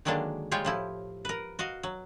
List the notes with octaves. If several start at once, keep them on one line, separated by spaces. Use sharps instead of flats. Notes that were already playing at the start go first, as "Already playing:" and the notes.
D3 D#3 F#3 G#3 A#3 D4
G3 G#3 F4 G4 C#5
A2 F3 E4
A#4 B4
F#4 D#5 F5
F#3